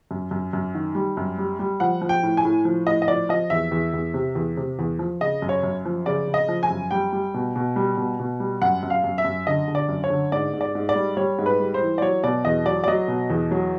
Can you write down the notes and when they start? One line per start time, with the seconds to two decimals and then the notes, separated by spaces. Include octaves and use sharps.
0.11 F#2
0.31 F#2
0.53 F#2
0.75 D#3
0.95 G3
1.17 F#2
1.38 G3
1.59 G3
1.80 F3 F#5
2.01 F3
2.09 G5
2.23 A2
2.37 G#5
2.45 A2
2.65 F3
2.87 A2 D#5
3.02 D#5
3.08 F3 D5
3.29 F3 D#5
3.50 E2 E5
3.71 E2
3.94 E2
4.14 C3
4.35 E2
4.57 C3
4.79 E2
4.99 F3
5.21 C#3 D#5
5.42 F#2
5.49 C#5
5.63 F#2
5.85 F3
6.06 C#3 D5
6.27 C#3
6.34 D#5
6.48 F3
6.63 G#5
6.71 F#2
6.91 G3 G5
7.13 G3
7.34 B2
7.56 B2
7.76 G3
7.97 B2
8.20 B2
8.40 G3
8.62 F#2 F#5
8.83 F#2
8.90 F5
9.04 F#2
9.18 E5
9.25 F#2
9.47 D3 D#5
9.68 D3
9.75 D5
9.89 F#2
10.04 C#5
10.10 D3
10.32 G#2 D5
10.53 G#2
10.61 D5
10.75 G#2
10.89 D5
10.95 G3
11.17 G3 C#5
11.38 G#2
11.46 B4
11.60 G3
11.74 C5
11.81 E3
11.98 D5
12.02 F#3 C#5
12.24 B2 D5
12.45 E2 D#5
12.65 F#3 D5
12.84 D5
12.88 F#3 D#5
13.08 B2
13.30 E2
13.51 F#3